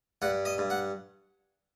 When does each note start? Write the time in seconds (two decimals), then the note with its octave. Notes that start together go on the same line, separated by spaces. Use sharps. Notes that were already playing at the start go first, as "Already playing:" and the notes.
0.22 G2 F#5
0.45 D#5
0.58 G2
0.70 F#5